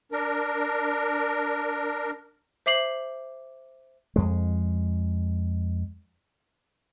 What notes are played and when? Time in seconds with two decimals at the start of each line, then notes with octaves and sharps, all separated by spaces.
0.12 D4 A#4
2.66 C5 E5 D6 C7 F#7
4.16 F2 G#3